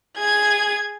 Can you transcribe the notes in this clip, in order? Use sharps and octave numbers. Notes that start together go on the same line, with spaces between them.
G#4 G#6